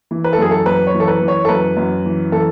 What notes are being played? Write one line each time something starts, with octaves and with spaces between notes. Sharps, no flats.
E3
B4
A4
F#2 G#4
A4
F#2 B4
C#5
E3
A4
B4
E3
C#5
A4
F#2 B4
F#2
E3
E3 A4